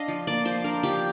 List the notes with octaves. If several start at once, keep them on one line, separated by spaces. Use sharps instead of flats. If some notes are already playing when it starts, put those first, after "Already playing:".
Already playing: D4 D#5 F5
F3
A#3 D5
F3 C5
D4 A#4
F3 G4